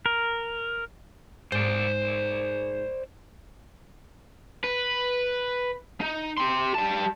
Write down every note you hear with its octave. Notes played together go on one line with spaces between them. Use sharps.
A#4
G#2 C5 D5
B4
D#4
G4 C6
G3 A5